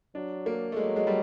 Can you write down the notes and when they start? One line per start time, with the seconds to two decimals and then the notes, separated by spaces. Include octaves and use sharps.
0.15 F#3 D4
0.46 A#3
0.72 A3
0.76 F#3 G#3
0.96 G#3
1.07 G3